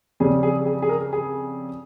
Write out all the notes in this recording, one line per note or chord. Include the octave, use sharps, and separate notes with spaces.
F2 C#3 G3 G#4
G#4
G#4
G#4
A#4
G#4